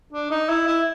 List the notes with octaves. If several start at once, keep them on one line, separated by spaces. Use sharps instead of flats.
D4
D#4
E4
E4